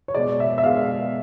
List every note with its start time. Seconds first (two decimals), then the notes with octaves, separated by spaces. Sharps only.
0.08 C#5
0.15 B2 G#3 D5
0.40 E5
0.58 E5
0.64 B2 G#3 F5